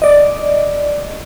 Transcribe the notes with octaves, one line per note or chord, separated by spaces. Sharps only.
D5 D#5